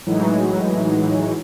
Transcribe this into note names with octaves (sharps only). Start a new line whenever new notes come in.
A2 E3 F#3 G#3 D#4